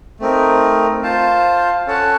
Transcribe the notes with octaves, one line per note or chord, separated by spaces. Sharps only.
A3 C4 D#4 A#4
F4 C5 F5 A5
C#4 A4 C#5 F#5 A5